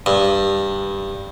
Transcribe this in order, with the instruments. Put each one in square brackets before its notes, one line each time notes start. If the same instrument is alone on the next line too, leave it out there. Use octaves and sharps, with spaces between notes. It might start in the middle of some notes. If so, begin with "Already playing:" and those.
[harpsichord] G2